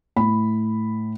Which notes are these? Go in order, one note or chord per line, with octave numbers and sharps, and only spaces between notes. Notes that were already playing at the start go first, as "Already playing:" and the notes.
A2 B5